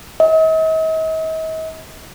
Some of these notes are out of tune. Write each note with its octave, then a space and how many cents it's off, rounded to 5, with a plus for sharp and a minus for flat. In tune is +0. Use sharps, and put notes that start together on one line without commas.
D#5 +45